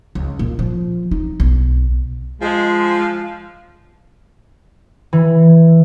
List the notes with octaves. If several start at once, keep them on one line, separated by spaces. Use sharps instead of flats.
C#2
A#2
F3
D#4
B1
F3 G#3
E3